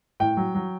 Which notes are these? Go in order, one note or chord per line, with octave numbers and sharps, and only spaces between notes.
A2 G5
F#3
F#3